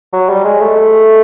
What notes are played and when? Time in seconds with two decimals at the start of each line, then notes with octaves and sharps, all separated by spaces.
0.13 F#3
0.29 G3
0.44 G#3
0.61 A3